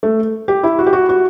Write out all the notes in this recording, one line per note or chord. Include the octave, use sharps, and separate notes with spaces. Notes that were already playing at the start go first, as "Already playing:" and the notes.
A3
G4
E4
F#4
G4
F#4
F#4